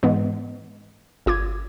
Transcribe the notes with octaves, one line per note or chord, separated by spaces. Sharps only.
G#2 E3 G#3 B3
G1 F4 D6 G#6